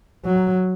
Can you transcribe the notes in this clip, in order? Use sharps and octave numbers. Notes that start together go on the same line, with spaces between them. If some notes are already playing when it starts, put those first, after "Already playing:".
F#3